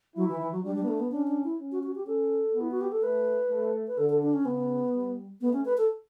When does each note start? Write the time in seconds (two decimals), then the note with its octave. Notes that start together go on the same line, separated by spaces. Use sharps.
0.16 F#3 E4
0.28 E3
0.40 E3
0.52 F#3
0.64 G3 D4
0.75 G3
0.83 B3
0.88 A3
1.00 B3
1.12 C#4 D4
1.27 D4
1.44 E4
1.59 C#4
1.72 F#4
1.83 F#4
1.95 G4
2.07 C#4 A4
2.55 B3
2.61 E4
2.71 F#4
2.81 G4
2.92 A4
3.03 A3 B4
3.50 A3
3.87 B4
3.98 D3 A4
4.09 A4
4.23 D4
4.34 C#4
4.45 C#3 B3
4.93 G3
5.41 A3 B3
5.53 C#4
5.65 B4
5.78 A4